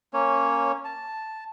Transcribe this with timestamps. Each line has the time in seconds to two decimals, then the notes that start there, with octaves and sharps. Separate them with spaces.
0.13 A#3 C#4 C#5
0.84 A5